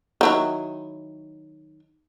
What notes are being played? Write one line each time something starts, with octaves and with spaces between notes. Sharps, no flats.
D#3 F#3 E4